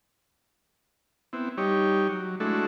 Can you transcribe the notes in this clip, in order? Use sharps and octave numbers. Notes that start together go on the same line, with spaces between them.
B3 C4 E4
G3 D#4 G4 C#5
F#3
G#3 A3 D4 E4 F#4 A4